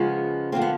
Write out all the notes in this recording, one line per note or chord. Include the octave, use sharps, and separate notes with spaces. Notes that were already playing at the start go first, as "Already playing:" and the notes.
Already playing: C#3 F3 G#3 B3
D3 F3 A#3 C4
B3